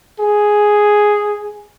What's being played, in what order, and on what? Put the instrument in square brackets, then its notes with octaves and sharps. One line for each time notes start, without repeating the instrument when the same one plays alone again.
[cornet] G#4